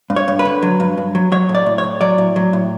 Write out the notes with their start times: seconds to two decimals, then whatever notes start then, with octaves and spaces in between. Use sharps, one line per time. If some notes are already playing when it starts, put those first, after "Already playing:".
0.10 G2
0.16 C#5
0.28 G2
0.39 B4
0.45 D3
0.62 F#3
0.80 G2
0.98 G2
1.15 F#3
1.32 F#3 C#5
1.49 A2
1.55 D5
1.66 A2
1.78 C#5
1.84 A2
2.01 F#3 D5
2.18 A2
2.36 F#3
2.53 A2